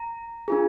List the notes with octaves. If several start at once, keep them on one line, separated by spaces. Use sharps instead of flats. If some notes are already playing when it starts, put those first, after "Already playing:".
Already playing: A#5
D4 F4 G#4